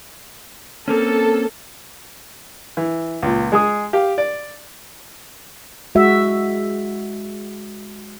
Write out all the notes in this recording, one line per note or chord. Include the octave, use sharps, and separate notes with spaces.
A#3 C4 C#4 A4
E3
C#2 A#2
G#3 G#4 D#6
G4 F5
D5
G#3 F#4 E5